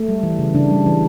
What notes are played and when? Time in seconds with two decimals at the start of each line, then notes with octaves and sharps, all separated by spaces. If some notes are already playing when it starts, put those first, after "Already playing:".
Already playing: A3
0.09 G3
0.23 E3
0.39 C#3
0.55 C#3 D4
0.71 G3
0.86 E3